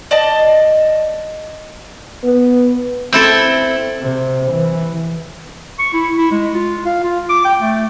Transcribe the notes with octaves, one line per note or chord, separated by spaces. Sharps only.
D5 D#5 A5
B3
C4 E4 A4
C3
E3
C#6
E4
E4
G#3
F4
F5
F4
D6
G5
A3